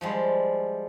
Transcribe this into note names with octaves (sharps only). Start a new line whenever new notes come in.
F3 G3 G#3